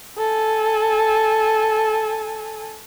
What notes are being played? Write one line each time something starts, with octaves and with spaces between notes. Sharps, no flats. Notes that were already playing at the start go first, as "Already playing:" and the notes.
A4 G#5